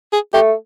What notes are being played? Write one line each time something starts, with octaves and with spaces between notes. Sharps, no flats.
G#4
A3 G4